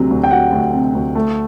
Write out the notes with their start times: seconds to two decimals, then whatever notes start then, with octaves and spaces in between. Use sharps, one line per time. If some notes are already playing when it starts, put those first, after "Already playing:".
Already playing: D2 C3 F#3
0.10 D2
0.24 G5
0.31 F#3 F#5
0.52 D2
0.73 C3
0.95 D2
1.15 A3